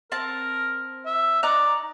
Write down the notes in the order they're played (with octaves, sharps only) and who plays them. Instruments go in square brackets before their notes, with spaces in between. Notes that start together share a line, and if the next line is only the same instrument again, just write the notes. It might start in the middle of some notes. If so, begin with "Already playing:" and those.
[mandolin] C4 A5 [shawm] A#4
[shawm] E5
[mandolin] D#4 A#5 F#6 [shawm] D5